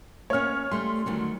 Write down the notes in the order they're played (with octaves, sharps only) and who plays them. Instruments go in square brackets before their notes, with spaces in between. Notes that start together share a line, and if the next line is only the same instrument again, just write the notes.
[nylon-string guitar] A#3 C#4 [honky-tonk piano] C#5 F6
[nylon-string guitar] G3 A3 [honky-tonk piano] C6
[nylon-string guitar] D2 D#3 F#3